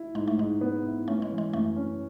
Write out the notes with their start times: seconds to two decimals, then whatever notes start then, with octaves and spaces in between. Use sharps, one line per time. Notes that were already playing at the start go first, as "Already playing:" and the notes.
Already playing: E4
0.15 G#2 G#3
0.28 A3
0.38 G#2 G#3
0.61 B3
0.84 E4
1.08 A3 C#4
1.22 G#3
1.30 E3
1.38 G#3
1.53 F#2 A3
1.76 C#4